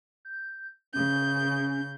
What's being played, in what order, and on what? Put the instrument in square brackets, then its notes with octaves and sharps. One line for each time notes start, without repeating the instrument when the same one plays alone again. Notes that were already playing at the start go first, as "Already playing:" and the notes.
[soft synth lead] G6
[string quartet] C#3 G6 [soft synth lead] C#4